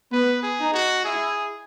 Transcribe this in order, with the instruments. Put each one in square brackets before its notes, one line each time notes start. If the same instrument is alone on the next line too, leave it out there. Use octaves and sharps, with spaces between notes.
[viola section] B3 [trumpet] B4
[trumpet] G#4
[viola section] D#4
[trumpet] F#4
[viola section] E4 [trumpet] G#4